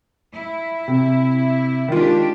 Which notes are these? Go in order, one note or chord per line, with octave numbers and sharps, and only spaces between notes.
E4
C3
D#3 G#3 D4 F4 G4